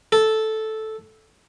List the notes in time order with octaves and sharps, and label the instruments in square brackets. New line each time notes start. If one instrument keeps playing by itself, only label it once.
[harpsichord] A4